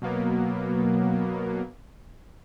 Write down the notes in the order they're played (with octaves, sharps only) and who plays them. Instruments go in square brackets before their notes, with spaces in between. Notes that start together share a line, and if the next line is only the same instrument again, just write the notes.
[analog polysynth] B2 F#3 A#3 B3